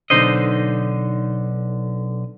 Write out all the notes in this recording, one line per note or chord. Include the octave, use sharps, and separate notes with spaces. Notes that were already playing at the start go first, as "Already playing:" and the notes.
B1 F2 D3 D#4 C5 D#5